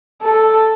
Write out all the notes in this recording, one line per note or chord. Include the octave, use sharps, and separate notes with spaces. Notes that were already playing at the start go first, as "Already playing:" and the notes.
A4